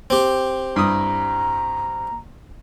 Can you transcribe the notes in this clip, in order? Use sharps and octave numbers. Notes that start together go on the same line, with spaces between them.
C4 G4
G2 E4 A#5 D#6